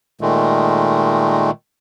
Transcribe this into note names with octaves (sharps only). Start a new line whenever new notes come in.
A#2 D#3 G#3 A3